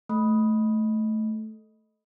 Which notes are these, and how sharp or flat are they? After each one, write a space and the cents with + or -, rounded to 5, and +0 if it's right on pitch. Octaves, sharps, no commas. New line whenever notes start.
A3 -10